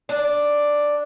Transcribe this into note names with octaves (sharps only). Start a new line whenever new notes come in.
D4